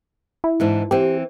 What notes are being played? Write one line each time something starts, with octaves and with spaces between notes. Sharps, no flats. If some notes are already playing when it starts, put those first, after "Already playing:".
E4
G#2 E3 D4
E3 C4 G4